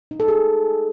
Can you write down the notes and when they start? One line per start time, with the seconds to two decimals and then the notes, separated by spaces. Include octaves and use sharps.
0.11 D#4
0.20 A4
0.28 G#4